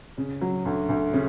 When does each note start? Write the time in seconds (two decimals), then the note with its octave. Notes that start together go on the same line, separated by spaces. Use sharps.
0.18 C#3
0.41 F#3
0.65 D2
0.89 D2
1.13 C#3